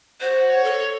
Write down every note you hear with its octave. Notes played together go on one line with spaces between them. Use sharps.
F#4 C5
C#5
A4